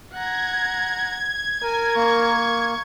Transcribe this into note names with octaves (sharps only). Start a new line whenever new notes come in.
F#5 A#5 G#6
A#4 G#5
A#3 C#6